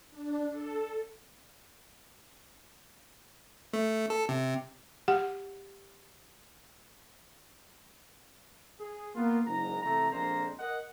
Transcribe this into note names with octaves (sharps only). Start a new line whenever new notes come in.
D4
A4
A3
A4
C3
G4 F#5
G#4
A#3 B3 F4
F#1 G#2 A#5
C3 E3 A3 A4 A#5
A#1 F2 A#2 G#3 C5 A#5
A#4 D#5 F#5